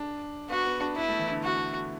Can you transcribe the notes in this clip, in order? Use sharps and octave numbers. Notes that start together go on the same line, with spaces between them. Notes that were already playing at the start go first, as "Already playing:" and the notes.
Already playing: D4
B3 F#4
B3
D4
B3 E4
A3
E3
D3
F#4